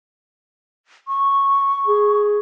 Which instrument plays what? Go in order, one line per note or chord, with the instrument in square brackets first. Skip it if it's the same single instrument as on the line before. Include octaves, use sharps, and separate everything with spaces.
[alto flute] C#6
[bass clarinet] G#4